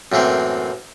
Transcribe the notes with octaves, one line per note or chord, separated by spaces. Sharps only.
F#2 A2 E3 A#3 C4